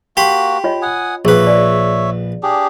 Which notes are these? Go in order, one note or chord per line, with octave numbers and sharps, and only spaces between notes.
A#3 F#4 G4 B5 C6
F4 C#5 D#5
F#5 G#5 D#6
A#1 G#4 B4 C#5 E5
D5
D4 G4 G#4